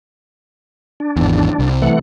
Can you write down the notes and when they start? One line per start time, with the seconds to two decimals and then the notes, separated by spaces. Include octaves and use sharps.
1.00 D4
1.17 G#1 E2
1.59 C2
1.82 E3 A3 F#5